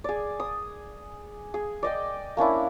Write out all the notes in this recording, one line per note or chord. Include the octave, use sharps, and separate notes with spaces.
G#4 D5
D#6
G#4
D5 D#5 G5
A#3 C#4 D4 E4